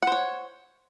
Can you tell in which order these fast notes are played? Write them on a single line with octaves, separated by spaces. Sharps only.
F#5 C5 C#5